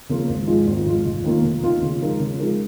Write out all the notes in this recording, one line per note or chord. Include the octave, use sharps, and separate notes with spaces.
C#3 F3 A#3 F4
G#1
G#2 F3 G#3 F4
G#1
G#2 F3 G#3 F4
F1
D#2 D#3 A#3 F4
F1
D#2 D#3 A#3 F4
C#3
F3 G#3 D#4 A#4
C#3
F3 G#3 D#4 A#4